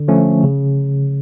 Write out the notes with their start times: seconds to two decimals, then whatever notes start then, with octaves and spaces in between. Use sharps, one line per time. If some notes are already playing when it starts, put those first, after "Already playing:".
Already playing: D3
0.08 F3 A3 C#4
0.43 C#3